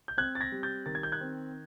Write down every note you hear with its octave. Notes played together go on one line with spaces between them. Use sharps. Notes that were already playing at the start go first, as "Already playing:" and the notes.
G6
C4 F#6 G#6
A6
G#6 A#6
G3
G6 A6
D#3 A6
G#6
G6
F#6 G#6
C4